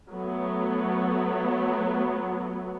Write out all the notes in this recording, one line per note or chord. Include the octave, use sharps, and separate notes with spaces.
F#3 A3 B3